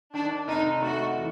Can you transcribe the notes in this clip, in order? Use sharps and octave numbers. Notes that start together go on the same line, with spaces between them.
D#3 D4
F1 D#4
A3 F#4
E3